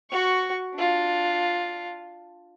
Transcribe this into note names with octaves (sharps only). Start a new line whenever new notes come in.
F#4 C#6
D4 F4